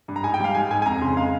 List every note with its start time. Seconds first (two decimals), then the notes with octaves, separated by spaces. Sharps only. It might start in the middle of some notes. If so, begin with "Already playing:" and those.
0.08 G2
0.16 A#5
0.23 G#2 G#5
0.34 G5
0.40 G3 F5
0.55 G#2 G#5
0.70 G#2 G#5
0.82 G#5
0.86 F2 A#5
1.01 C#3 C6
1.17 G#3 F5